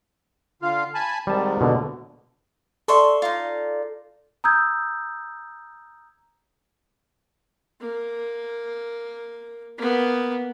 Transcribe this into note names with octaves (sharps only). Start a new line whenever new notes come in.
D3 F4 F5
G#5 A5 B5
G#2 C3 D#3 G3 A5
B2 D3
A4 D5 E5 C6 C#6
D#4 F4
A#5 D#6 E6 G6 G#6
A#3
A#3 B3